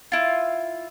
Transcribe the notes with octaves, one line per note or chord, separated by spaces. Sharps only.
E4 F4